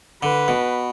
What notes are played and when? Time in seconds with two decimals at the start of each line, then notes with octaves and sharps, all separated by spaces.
0.23 D3 B4
0.48 B2